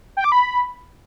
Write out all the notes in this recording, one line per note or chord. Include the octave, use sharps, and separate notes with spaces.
G5
D6
B5